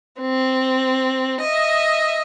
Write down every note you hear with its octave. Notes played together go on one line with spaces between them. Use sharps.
C4
D#5 E5